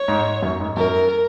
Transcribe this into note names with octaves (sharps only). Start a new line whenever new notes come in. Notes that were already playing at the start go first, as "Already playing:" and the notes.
Already playing: C#5
G#2
F#2
G#2
F#2 A#4